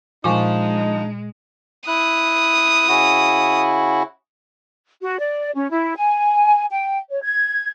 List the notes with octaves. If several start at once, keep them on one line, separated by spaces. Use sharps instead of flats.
A#2 F3 G#3 D4 D#4 G#5 C#6
E4 D#6 F#6
C#3 E4 F#4
F#4
D5
C#4
E4
G#5
G5
C#5
G#6